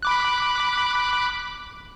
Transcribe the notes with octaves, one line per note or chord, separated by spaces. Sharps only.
B5 D6 F#6